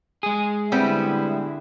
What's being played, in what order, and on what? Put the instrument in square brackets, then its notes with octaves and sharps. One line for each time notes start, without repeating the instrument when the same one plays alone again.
[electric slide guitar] G#3 G#4
[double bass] D3 E4 [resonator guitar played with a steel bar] G3 B3 C4